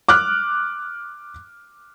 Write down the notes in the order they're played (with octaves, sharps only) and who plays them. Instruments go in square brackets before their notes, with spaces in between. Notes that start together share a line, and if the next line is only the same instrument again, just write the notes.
[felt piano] D6 F6 F#6